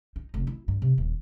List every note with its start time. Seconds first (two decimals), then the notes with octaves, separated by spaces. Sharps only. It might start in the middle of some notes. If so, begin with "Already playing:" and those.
0.16 D#4
0.34 F1
0.47 E4
0.68 G2
0.82 C3
0.98 D#1